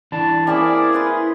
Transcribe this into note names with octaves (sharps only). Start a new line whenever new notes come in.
E3 D4 A5
A#3 C4 C#4 E4 G#4 D5
E3 B4 C6